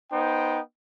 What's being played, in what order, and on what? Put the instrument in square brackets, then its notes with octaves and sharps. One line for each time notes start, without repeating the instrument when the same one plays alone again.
[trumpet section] B3 D#4 C5 G5